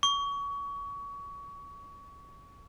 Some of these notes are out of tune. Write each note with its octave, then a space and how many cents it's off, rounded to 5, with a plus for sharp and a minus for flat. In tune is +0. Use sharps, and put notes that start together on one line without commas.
C#6 +30